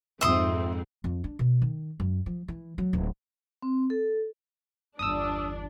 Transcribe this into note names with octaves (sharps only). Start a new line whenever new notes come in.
F2 G#2 C4 E5 C6 D#6
F2
D4
B2
D#3
F#2
F3
E3
F#3
D1
C4
A4
G1 E2 D4 D#6 E6